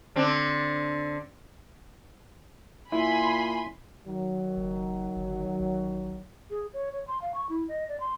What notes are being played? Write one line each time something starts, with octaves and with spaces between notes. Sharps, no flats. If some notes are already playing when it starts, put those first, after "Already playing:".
D3 C4 D4
A#2 E4 G#5 B5 C6
D#3 F#3
F#1
G1
A1
G#4
C#5
C#5
C6
F5
C#6
E4
D#5
D5
C6